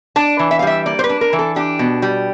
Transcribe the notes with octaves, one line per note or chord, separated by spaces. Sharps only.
D4 A5
E3
E5
F5
G3 E5
A#3 D5
C5
B4
D4
A#4
E3
A4
D4 G4
B2
G3